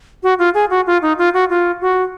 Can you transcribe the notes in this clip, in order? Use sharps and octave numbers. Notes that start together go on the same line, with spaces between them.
F#4
F4
G#4
F#4
F4
D#4
F4
F#4
F4
F#4